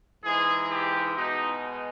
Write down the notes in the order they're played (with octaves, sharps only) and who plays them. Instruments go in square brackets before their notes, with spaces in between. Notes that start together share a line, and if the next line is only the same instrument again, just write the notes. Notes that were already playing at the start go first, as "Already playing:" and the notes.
[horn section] G#2 E3 G#3 G#4
G4
B2 G#3 D#4